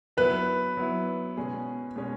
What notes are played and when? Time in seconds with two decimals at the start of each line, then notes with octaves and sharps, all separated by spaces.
0.17 F#3 B3 E4 B4
0.77 F#3 B3 E4
1.37 B2 G#3 C#4 G#4
1.96 B2 G#3 C#4 G#4